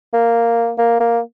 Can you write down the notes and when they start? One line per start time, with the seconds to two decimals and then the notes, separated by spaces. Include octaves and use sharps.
0.13 A#3
0.78 A#3
1.00 A#3